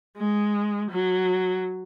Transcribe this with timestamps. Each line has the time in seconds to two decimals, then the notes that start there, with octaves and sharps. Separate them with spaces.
0.17 G#3
0.91 F#3